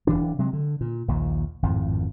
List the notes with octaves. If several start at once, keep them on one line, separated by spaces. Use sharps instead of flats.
D1 D#2 E3 D4
C3 F#3 G#3
D3
A#2
A#1 D#2 A#2
G#1 F2 A2